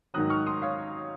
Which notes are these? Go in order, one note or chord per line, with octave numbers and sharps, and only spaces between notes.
G#2 D#3 F#3 D#6 F#6
C#6 F6
C6 D#6
C#5 F5